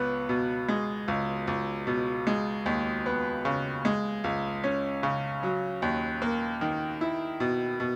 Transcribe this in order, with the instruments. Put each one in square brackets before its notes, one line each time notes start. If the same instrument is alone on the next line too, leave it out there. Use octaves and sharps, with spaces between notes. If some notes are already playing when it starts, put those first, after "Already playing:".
Already playing: [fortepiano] C#2 B3
B2
G#3
C#2
C#2
B2
G#3
D#2
B3
C#3
G#3
C#2
C#4
C#3
F#3
D#2
A#3
D#3
E4
B2
B2